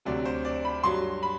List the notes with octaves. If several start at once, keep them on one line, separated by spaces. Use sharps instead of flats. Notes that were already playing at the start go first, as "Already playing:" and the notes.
D2 C3 F#3 D5
C5
D5
B5
G2 F#3 C6
B5